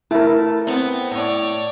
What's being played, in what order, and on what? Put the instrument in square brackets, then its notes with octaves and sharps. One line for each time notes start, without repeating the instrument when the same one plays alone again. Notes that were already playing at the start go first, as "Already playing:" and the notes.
[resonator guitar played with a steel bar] A3 [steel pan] E4 A#4
[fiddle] B3 [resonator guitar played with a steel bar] C4
[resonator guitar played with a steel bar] A2 [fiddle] C#5 D5